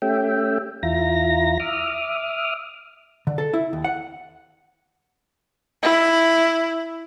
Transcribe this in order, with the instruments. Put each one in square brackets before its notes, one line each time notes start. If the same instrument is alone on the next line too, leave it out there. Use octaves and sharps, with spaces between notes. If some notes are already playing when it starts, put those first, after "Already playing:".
[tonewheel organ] A3 C#4 G4 E5 G5
E2 E4 F4 A#5 A#6
E5 D6 D#6 F6
[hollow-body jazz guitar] D3
A4
E4
D#2
F#5
[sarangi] E4